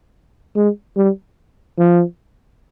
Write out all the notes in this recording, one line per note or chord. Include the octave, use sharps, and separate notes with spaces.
G#3
G3
F3